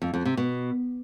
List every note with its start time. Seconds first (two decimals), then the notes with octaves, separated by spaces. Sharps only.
0.02 F2
0.14 F2
0.25 C3
0.37 B2